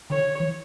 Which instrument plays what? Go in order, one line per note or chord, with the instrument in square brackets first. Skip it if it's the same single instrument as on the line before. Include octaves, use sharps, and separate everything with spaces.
[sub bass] D3 [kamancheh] C#5
[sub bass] E3